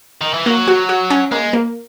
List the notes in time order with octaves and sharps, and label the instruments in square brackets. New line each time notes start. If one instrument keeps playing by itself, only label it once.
[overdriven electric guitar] D#3
E3
[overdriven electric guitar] F#3 [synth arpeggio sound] A#3
[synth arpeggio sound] F#4
F#4
C#4
[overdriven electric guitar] G#3 [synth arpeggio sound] A#3
[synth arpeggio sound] A#3